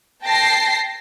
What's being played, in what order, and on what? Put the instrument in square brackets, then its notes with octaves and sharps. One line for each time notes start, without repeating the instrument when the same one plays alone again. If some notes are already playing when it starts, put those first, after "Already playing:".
[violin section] G5 A5 A#6 C7